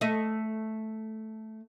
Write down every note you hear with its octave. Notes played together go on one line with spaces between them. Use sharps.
A3 D#5